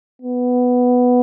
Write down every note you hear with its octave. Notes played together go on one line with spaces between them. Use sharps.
B3